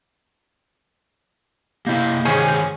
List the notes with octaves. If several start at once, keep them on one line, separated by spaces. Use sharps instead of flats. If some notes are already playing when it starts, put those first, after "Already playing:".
C3 A#3 E4 D#5 G6
D#3 C#4 G#4 C5